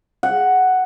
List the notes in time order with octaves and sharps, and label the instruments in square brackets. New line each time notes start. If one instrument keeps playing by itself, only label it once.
[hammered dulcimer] F#5